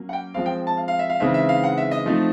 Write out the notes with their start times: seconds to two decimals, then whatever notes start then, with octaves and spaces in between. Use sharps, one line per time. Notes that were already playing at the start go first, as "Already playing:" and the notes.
Already playing: F#3 A#3 C#4
0.09 F#5
0.13 G5
0.34 F3 G#3 C4 F5
0.46 G5
0.67 A5
0.77 F5
0.88 F5
0.99 E5
1.10 F5
1.20 C#3 E3 G#3 C4 D#4 E5
1.34 E5
1.49 F5
1.64 F#5
1.78 E5
1.91 D#5
2.06 F3 A3 C4 D#4